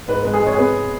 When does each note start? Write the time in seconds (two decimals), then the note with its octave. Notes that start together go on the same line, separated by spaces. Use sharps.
0.08 G#2 B4
0.21 G#3 B4
0.34 G#4
0.42 G#3 C#5
0.53 G#4
0.58 B3 B4